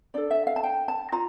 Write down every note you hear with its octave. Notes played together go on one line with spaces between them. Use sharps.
D4 A4 D5
E5
F5
A5
G5
A5
F4 A#5